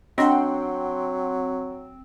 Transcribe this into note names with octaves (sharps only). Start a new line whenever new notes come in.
F#3 C4 D4 D#5 F#5 G5 C6